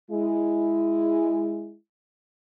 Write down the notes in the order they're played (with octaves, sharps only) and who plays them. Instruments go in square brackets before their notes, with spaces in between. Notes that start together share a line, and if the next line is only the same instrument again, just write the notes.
[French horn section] G#3 E4